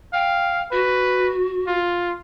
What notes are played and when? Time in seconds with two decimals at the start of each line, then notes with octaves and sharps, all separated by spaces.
0.13 F5 G5
0.71 F#4 B4
1.67 F4